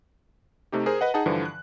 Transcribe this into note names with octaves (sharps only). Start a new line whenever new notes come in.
C3 A3 D#4 G4
G#4 A#4 C5
B4 D#5 F#5
D#4 G#4 F#5 A5
G2 D3 E3 F3
F#6